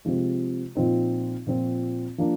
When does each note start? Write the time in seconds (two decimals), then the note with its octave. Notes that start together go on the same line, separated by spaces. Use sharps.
0.05 C3 F3 G#3
0.75 A#2 F3 C4 D#4
1.47 A#2 F3 C4
2.18 F3 A#3 D4